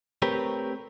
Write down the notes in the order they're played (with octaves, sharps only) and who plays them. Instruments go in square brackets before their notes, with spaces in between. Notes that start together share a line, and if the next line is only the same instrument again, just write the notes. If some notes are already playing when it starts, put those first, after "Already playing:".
[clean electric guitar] A3 C4 G4 A#4 B4 C#5